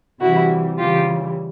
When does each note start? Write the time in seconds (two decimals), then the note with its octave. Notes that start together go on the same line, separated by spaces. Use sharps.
0.21 C3 E3 G3 E4 F#4
0.78 C#3 E3 G3 F4 G4